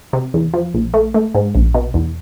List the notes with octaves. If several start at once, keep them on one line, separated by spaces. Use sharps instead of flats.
C3
E2
F3
A#1
A3
A3
G#2
A#1
B2
E2